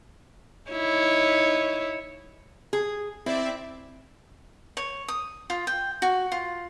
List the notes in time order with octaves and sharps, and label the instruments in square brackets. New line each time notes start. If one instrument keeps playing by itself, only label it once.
[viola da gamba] D#4 E4 C#5
[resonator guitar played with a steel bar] G#4
[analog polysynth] C4 D5 E5 [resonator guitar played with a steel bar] E4
[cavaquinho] C#5
D#6
F4
G5
F#4
F4